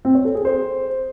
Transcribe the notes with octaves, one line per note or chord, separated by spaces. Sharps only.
C4
C#5
A4
G#4
C5